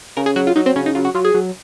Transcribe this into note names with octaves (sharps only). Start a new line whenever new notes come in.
C#3 A#4
G#4
F#3 F#4
F4
F#3 D#4
C4
C#3 C#4
D#4
F#3 F4
F#4
F#3 F4
G#4
F#3